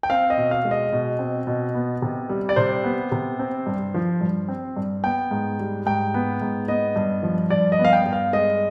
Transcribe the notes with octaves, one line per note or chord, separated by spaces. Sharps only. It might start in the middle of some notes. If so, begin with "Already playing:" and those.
G5
C4 F5
D#5
B2
F5
G#3
D#5
B2
C4
B2
B3
C3
G3
D5
C3 C5
B3
C3
C4
G2
F3
G2
C4
G2
B3 G5
G#2
G3
G#2 G5
B3
G#2
B3 D#5
G2
F3
G2 D5
D#5
B3
F5
G5
G2
F5
G#3 D#5